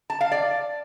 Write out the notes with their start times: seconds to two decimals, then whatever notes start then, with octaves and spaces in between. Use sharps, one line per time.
0.10 A5
0.21 F5
0.32 D5